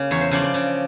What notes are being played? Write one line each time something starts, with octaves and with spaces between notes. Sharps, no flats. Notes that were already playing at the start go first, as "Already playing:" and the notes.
Already playing: C#3 A#3
E2 C#5
C5
C#3 F3 D5
D5
C#3